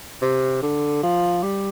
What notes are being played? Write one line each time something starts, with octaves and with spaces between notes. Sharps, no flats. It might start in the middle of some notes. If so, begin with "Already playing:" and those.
C3
D3
F3
G3